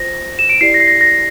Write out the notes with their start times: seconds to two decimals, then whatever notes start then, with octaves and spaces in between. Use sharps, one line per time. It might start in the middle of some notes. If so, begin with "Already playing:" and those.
Already playing: F4 C5 A#6
0.39 E7
0.49 D7
0.61 E4 G4 D5 C7
0.74 A#6
0.80 C7
0.88 A#6
1.01 A#6